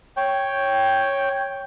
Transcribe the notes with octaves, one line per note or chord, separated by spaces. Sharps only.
C#5 G5